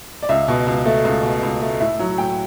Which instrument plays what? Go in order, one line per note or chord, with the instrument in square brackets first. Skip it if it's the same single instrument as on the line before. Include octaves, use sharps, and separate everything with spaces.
[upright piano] D5
C#2 E5
B2
C#2
A3
C#2
B2
C#2
A3
A2 E5
F#3
A2 G5